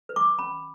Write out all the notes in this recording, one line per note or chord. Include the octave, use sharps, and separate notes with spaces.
B4
D6
C#4 B5